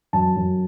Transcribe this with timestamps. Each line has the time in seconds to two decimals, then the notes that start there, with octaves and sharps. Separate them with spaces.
0.13 F#2 A5
0.36 F#2